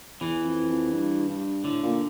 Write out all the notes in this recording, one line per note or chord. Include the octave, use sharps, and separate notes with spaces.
E2 E3
F2
F2
G2
G2
A2 D3
A#2